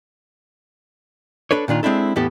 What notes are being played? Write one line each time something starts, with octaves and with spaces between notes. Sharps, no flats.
D4 A4 B4 C#5
A#2 D#3 D4 F4
G#3 C4 D4 E4 A4
E2 A2 B3 G4 A4